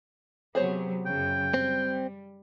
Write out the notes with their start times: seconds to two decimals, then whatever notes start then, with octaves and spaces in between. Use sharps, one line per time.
0.55 C3 F#3 B3 G#4 C5 C#5
1.06 F#2 C#3 G5
1.54 G3 C4